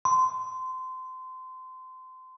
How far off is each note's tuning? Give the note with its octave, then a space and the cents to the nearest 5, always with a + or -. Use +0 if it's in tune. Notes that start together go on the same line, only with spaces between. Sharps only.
C6 -25